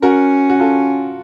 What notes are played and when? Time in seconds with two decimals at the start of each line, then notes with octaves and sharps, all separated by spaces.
0.02 C#4 F#4 A#4
0.49 F#4
0.60 F4 A4